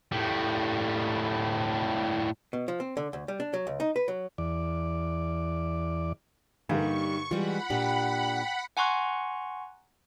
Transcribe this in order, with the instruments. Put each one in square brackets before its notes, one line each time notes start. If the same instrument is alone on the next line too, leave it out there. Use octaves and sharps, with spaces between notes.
[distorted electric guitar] A2 G3
[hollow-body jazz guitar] B2
F3
C4
D3
D2
G3
D4
F#3
C#2
D#4
B4
F#3
[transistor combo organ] E2 D5
[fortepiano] G2 D3 A#3 [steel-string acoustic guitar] G3 [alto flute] D#4 [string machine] C#6
[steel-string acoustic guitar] E3 G3 [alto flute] G#3 [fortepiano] F4 [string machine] F#5 B5
[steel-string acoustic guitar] A#2 D4 G4 [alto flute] G5
[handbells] F#5 G#5 A#5 C6 C#6 F#6